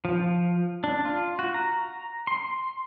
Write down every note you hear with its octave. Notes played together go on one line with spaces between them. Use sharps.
F3
D4
F4
F#4
A#5
C6